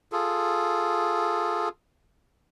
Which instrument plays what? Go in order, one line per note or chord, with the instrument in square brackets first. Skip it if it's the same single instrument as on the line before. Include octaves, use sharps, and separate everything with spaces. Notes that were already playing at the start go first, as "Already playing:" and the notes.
[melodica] F4 G#4 A4